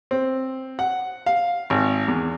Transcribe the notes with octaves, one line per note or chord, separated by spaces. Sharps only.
C4
F#5
F5
G#1
E2